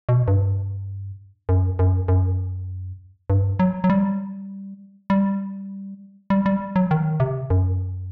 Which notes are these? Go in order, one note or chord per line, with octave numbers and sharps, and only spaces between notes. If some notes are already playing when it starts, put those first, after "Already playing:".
B2
G2
F#2
F#2
F#2
G2
F#3
F#3
G3
G3
G3
G3
F#3
D#3
C3
F#2